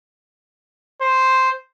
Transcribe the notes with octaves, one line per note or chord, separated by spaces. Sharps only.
C5